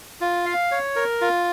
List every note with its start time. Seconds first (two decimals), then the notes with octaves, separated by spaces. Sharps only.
0.21 F4
0.46 F5
0.71 C#5
0.96 A#4
1.21 F4